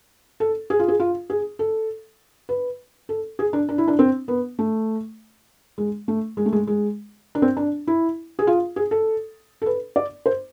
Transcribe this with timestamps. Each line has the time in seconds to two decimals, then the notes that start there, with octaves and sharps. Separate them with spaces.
0.40 A4
0.70 G#4
0.79 F4
0.88 G#4
1.00 F4
1.30 G#4
1.59 A4
2.49 B4
3.09 A4
3.39 G#4
3.53 D4
3.69 D4
3.78 E4
3.88 D4
3.99 C4
4.28 B3
4.59 A3
5.78 G#3
6.08 A3
6.37 G#3
6.46 A3
6.53 G#3
6.67 G#3
7.35 D4
7.42 C4
7.57 D4
7.87 E4
8.39 G#4
8.47 F4
8.76 G#4
8.91 A4
9.62 A4
9.66 B4
9.96 D5
10.26 C5